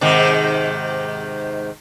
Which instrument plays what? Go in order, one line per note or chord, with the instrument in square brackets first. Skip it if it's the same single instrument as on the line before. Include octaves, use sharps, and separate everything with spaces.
[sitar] G#2 C3 D#3